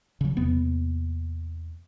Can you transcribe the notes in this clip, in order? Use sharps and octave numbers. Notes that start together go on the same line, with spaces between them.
C#3 F#3
E2 C3 A#3 B3